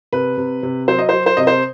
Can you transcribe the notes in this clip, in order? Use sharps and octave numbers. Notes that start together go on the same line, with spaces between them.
C3 B4
C3
C3
F#3 C5
D#5
F#3 C5
C5
C3 D#5
C5